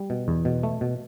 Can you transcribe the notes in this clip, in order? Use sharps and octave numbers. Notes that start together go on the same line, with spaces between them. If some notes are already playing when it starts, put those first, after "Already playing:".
Already playing: G3
B2
E2
B2
A3
B2